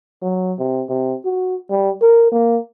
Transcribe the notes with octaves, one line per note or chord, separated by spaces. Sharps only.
F#3
C3
C3
F#4
G3
A#4
A#3